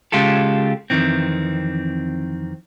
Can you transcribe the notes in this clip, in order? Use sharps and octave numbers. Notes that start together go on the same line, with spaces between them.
C#3 G#3 F4 G4 A4
F2 D#3 E3 C4